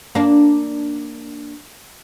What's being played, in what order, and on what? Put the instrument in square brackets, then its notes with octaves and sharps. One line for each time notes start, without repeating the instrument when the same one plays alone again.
[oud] A#3 D4